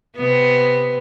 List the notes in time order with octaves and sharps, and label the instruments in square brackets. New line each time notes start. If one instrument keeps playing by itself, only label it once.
[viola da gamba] C3 B3